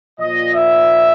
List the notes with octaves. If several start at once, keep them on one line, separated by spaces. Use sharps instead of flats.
A#2 F3 D#5
E5